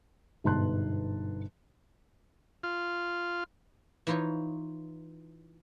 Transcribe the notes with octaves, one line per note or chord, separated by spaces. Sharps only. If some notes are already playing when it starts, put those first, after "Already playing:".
G1 G#2 B2 A5 C6 F#6
F4
E3 D#4 F4 C5 C#5